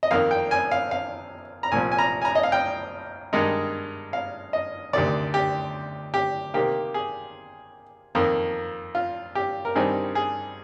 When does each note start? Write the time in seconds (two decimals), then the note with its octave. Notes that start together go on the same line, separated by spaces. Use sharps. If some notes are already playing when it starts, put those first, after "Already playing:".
0.03 D#5
0.11 F2 D#3 A#3 F5
0.31 G5
0.51 G#5
0.71 F5
0.91 F5
1.63 A#5
1.72 C2 A#2 F3 G#5
1.92 G#5
1.98 A#5
2.22 G#5
2.25 A#5
2.35 D#5
2.43 F5
2.52 G5
3.33 G2 D#3 G#3 D#4
4.13 F5
4.53 D#5
4.93 D2 C3 D#3 D5
5.34 G4
6.14 G4
6.54 C3 D#3 A#3 G4
6.94 G#4
8.15 F2 D#3 A#3
8.95 F4
9.35 G4
9.65 A#4
9.75 G2 D#3 G3 C4 D#4 G#4
10.15 G#4